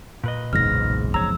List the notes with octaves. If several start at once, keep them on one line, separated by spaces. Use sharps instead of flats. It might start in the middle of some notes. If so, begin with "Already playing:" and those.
A#2 B4 D#5
F#1 B1 E2 G#2 C4 F6 A#6
F3 C#5 A#5 E6